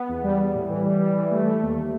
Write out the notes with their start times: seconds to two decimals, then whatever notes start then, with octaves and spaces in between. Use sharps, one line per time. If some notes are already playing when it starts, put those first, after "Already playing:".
Already playing: B3
0.08 E2
0.23 G3
0.39 G3
0.54 A2
0.69 E3
0.85 G3
1.00 G3
1.16 E3
1.31 A3
1.46 A3
1.62 D#2